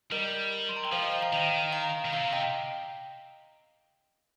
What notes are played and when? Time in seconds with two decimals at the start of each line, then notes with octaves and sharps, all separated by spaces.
0.12 G3 A#4 D#5
0.69 C6
0.76 A#5
0.85 G5
0.92 F3 C5 F5
1.03 D#5 G5
1.12 F5 A#5
1.22 F5 A#5
1.32 D#3 D#5 G5
1.73 F5 A#5
2.05 D#3
2.13 C3 F5 A#5
2.33 D#5 G5